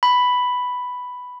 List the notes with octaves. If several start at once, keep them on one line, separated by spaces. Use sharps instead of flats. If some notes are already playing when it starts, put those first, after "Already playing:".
B5